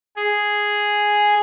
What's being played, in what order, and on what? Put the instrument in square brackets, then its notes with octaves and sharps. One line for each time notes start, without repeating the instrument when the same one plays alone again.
[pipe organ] G#4